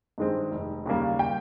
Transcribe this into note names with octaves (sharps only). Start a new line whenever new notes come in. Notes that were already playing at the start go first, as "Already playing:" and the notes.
G2 D#3 G#3 C4
F1
D#2 C#3 G3 A#3
G5